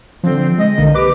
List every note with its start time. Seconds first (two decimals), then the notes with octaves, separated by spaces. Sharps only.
0.23 D3 F3 C4
0.58 G#3 D#5
0.78 B1 D3 A#3
0.94 G4 B4 D6